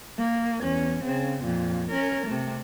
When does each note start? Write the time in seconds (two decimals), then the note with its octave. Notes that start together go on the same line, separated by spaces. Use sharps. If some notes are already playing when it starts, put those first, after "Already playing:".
0.18 A#3
0.60 E2 C#4
1.04 C#3 C4
1.44 F2 A#2
1.91 C#4 A#4
2.27 C3 A3